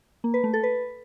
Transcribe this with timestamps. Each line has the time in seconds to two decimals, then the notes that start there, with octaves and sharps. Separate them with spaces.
0.24 A#3
0.34 B4
0.44 A3
0.54 A4
0.63 B4